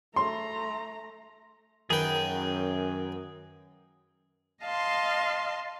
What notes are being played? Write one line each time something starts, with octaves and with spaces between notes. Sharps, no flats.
A3 A#5 C6
F#2 D#3 G#4 B4 G5
D#5 F5 A5 C6